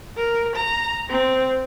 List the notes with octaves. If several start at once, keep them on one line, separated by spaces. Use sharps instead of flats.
A#4
A#5
C4